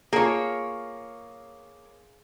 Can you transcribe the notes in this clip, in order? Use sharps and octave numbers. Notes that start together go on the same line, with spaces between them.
A#3 F4 G#4 C#5